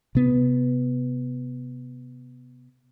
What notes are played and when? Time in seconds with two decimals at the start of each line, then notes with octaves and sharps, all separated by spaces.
0.15 C3 B3